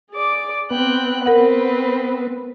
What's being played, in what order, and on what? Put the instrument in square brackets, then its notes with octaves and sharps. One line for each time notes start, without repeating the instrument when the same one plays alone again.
[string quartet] G#4 D5 D6
[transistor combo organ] B3 [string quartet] C4 G5 F#6
[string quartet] C4 B4 [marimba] A#4 F#5